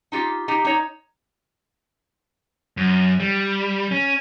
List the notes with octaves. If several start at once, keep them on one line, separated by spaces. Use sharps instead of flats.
D#4 F4 G4
D#4 G4
D#4 C#5
F#2
G3
C#4